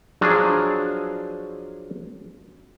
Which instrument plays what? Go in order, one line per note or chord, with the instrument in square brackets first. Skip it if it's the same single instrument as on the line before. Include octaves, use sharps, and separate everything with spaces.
[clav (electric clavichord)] F3 F#3 D4 G#4